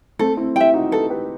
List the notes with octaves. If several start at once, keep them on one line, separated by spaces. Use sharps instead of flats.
A3 C4 A4
C4 E4
E4 G4 E5 G5
D#4 F#4
G4 A4 B4
G4 B4